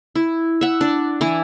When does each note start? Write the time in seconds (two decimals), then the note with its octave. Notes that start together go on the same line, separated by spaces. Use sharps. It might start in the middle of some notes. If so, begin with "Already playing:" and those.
0.15 E4
0.61 E5 F#5
0.81 D4
1.21 E3 E4